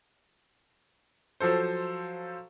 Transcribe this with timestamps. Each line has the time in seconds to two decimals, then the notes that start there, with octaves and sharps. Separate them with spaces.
1.40 F3 F#3 A4 C5